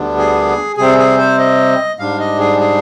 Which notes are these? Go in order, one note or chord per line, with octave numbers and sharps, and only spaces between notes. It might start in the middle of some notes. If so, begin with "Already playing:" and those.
Already playing: D2 D3 G3 B3 D4
G#4
C3 G3 C4 G#4
G#4
C5
D#5
G#2 G3 D4 F5
D#5
G#4
G#4